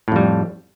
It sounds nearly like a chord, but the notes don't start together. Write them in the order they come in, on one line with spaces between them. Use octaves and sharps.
A2 F2 G3